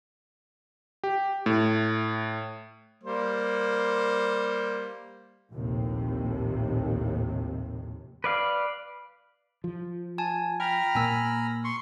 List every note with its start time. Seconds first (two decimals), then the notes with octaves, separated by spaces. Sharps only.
1.04 G4
1.46 A2
3.04 G3 A#3 C5
5.53 A#1 D#2 A2 C3
8.24 B4 D5 F5
9.64 F3
10.18 G#5 A5
10.60 G5 A#5 B5 F6
10.95 A#2 A#3 G#5 E6
11.64 C6 C#6